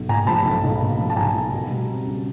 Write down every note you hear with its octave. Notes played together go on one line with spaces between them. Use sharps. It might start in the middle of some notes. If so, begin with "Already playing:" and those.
Already playing: B1
A#2 G#5 A#5
F3 A5 B5
B1
B1
A#2
F3
A5
B1 G#5 A#5
B1
B2
G3
C4
C#2